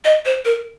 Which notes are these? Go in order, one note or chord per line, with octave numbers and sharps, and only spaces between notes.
D#5
C5
A#4